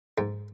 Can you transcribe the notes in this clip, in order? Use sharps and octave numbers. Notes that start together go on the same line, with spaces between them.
G#2